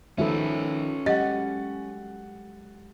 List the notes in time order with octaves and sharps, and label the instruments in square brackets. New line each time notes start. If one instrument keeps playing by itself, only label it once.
[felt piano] D#3 F3 [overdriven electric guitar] C#4 B4 [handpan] A4 E5
[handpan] F#3 G#3 G4 [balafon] D#5 [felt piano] F#5 A6